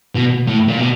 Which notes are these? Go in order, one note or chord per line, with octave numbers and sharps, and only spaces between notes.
B2
A2
A#2
B2